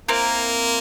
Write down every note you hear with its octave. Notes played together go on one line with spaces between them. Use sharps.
A#3 C4 E4 A#4